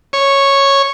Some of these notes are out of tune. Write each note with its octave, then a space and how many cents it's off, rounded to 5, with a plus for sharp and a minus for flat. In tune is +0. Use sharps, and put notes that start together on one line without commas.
C#5 -5